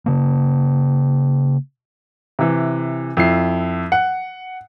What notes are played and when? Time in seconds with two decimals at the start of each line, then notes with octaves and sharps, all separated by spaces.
0.06 C#3 A#3
2.39 C3 E3
3.17 F2 E4 C7
3.92 F#5